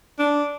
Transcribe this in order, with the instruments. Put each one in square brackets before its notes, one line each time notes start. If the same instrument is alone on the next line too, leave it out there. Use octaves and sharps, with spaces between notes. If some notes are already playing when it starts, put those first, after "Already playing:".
[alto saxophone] D4